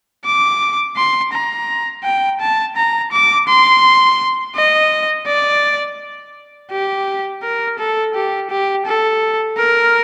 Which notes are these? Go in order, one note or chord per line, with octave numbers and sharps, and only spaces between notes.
D6
C6
A#5
G5
A5
A#5
D6
C6
D#5
D5
G4
A#4
A4
G4
G4
A4
A#4